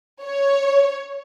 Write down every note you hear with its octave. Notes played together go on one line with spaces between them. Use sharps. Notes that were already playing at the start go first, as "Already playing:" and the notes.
C#5